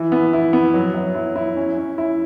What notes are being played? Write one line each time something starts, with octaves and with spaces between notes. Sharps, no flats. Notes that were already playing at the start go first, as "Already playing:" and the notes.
Already playing: E3
B3
E4
B3
F#3
F#3
E4
E4
C#4
C#4
E4